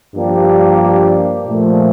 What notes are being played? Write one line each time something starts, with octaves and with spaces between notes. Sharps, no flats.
G2 F3 A#3 D4 G4
A#2 F3 A3